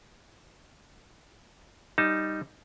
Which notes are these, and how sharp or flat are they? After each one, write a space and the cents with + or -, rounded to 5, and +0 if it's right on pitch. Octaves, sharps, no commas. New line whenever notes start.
G3 +0 D#4 +0 A5 +15